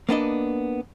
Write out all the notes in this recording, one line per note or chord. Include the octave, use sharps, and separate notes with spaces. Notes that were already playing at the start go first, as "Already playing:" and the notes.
A#3 B3 D4 D#5